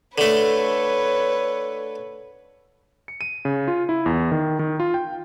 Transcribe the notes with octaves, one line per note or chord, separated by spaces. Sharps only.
D3 A3 A4 B4 C#5
C#7
D#7
C#3
F4
E4
E2
D#3
D#3
F4
G5